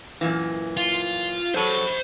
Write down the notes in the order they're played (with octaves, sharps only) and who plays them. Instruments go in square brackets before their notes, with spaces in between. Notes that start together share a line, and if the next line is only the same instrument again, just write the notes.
[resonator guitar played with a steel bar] F#2 A#2 E3
[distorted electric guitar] F4
[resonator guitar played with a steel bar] F#3 A4 C#5 [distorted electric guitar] C5 B5